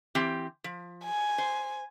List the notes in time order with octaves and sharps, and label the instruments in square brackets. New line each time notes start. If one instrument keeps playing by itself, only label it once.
[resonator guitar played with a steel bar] E3 C4 G4
F3
[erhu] G#5
[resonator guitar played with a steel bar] C5